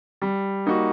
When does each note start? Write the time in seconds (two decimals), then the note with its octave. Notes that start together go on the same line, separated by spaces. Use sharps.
0.22 G3
0.66 A#3 D#4 F#4